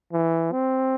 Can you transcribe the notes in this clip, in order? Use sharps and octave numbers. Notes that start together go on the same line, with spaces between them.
E3
C4